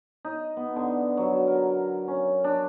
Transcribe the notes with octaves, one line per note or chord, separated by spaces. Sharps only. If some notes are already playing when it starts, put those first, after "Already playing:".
D#4
B3
D3
F#3
A#4
C#4
D4